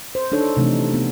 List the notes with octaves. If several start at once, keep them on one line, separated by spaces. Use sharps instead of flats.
C5
D4 D#4 A4 C#5
C3 E3 F3 A3 D4 D#4
B3